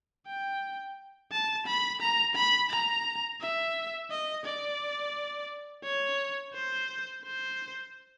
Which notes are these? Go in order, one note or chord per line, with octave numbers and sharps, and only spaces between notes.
G5
A5
B5
A#5
B5
A#5
E5
D#5
D5
C#5
C5
C5